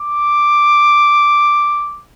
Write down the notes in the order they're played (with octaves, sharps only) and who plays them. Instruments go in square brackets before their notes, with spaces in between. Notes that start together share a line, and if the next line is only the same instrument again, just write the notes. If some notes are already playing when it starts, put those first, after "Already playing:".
Already playing: [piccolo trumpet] D6